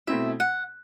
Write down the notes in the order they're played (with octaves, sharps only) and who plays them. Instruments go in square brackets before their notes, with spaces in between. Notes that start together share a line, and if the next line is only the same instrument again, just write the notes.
[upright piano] B2 A3 C4 E4 [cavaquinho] E5
[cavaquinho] F#5